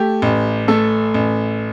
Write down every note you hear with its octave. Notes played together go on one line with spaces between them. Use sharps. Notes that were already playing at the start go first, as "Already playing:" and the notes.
Already playing: A3 G4
A1
A3 A4
A1